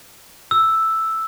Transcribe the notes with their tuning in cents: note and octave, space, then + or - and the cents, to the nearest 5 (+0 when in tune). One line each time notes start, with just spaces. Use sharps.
E6 +0